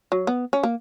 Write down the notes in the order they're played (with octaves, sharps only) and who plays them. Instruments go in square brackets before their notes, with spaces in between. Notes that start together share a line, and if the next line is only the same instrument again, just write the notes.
[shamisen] F#3
B3
C#4
A#3